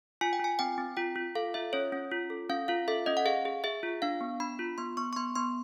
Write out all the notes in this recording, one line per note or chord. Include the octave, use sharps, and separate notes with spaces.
F4 G#5
G5
F4 G#5
C4 G5
C4
F4 G5
F4
A4 F5
F4 E5
C#4 C#5
C#4
F4
A4
C#4 F5
F4 F5
A4 E5
C#4 D#5
F#5
G#4 F5
G#4
G#4 E5
F4
D4 F5
B3
D4 B5
F4
B3 C6
B3 C#6
C#6
B3 C6
B3 C6